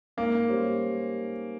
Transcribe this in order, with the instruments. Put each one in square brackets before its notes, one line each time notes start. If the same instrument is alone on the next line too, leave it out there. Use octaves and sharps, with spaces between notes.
[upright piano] G#2 [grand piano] A#3
[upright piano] G3 C#4 G4 C5